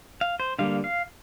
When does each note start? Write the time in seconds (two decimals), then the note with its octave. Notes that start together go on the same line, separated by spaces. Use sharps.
0.21 F5
0.40 C5
0.59 D3 G3 A#3 F5
0.84 F5